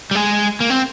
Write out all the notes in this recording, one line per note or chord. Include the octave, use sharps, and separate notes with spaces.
G3
G#3
A#3
C4